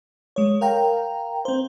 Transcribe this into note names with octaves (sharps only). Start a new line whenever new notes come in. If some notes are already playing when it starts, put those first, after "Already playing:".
G#3 C#5
A#4 F5 G5 A#5
C4 C5